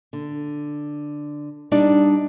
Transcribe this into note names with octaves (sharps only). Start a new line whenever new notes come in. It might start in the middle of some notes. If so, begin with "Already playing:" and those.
D3
G3 D4 D#4 D5